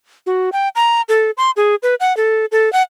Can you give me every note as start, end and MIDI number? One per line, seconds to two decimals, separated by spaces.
0.26 0.50 66
0.52 0.69 79
0.75 1.01 82
1.09 1.31 69
1.37 1.51 84
1.57 1.75 68
1.83 1.95 71
2.00 2.15 78
2.17 2.45 69
2.52 2.71 69
2.73 2.82 78